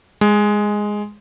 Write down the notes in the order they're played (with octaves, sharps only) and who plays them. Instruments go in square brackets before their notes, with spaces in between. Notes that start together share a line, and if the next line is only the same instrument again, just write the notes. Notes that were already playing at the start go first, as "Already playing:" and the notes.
[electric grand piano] G#3